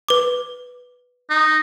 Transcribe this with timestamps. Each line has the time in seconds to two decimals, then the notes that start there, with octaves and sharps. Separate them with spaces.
0.08 B4 D6
1.30 D#4